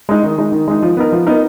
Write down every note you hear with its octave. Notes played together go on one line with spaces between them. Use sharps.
G#3 D#4
D#3
G#3 D#4
D#3
G#3 D#4
F3
B3 D#4 A#4
F3
B3 D#4 A#4